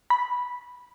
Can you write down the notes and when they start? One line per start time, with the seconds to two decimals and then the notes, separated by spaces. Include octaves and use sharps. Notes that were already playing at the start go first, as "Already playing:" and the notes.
0.10 B5